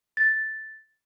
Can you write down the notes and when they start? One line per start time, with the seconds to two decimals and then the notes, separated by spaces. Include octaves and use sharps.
0.17 A6